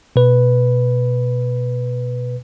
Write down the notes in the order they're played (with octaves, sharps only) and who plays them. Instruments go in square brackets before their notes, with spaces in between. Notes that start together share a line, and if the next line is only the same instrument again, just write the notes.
[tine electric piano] B2 B4